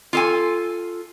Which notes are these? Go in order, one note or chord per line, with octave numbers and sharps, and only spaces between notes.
F4 A4 G#5